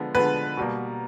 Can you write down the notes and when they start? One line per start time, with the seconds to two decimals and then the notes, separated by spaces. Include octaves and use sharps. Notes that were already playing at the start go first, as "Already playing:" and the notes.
Already playing: D3 F3 G#3 B3
0.15 D3 F3 G#3 B3 B4
0.57 B2 G3 A#3